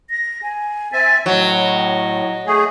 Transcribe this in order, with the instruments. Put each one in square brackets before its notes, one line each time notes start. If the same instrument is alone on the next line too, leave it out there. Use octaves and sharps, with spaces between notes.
[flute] A#6
G#5
[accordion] C4 E5 G#5 [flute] A6
[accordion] A2 [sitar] F#3 [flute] D#5
[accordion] A3 G#4